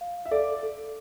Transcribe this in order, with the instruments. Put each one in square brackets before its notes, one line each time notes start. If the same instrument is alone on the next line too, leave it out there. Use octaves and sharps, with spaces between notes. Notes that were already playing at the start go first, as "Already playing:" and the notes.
[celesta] F5
[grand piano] E5
[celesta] A4 [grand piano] D5
[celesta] A4